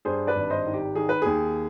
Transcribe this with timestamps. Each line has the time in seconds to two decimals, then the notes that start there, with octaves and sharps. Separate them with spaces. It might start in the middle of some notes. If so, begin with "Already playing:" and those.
0.05 G2 G#4 C5
0.27 B4 D5
0.36 G#1
0.50 C5 D#5
0.66 D#3
0.73 G4
0.95 D#3 G#4
1.09 B4
1.22 D#2 G#4